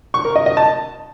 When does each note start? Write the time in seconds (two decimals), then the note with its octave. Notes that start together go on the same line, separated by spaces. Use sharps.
0.14 C#6
0.25 A#4
0.36 D#5
0.46 D#5
0.57 A5